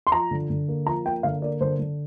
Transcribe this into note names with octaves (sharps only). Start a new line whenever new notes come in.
C6
F3 A#5
D3
D3
A#3
F3 A#5
A#3 G5
D3 F5
A#3 D5
D3 C5
D3